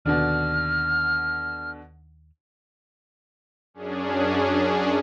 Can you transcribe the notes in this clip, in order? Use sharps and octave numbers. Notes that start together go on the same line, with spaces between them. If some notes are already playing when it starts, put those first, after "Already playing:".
D#2 B2 D3 D4 F6
F#2 C#4 D4 G#4